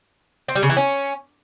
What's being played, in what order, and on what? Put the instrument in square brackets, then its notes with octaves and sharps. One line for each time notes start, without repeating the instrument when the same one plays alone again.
[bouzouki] C4
G3
C#3
E3
C#4